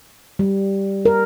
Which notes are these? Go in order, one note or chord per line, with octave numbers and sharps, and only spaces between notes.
G3
A#4